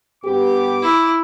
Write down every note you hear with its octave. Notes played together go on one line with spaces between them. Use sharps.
G2 B3 G4 D6
E4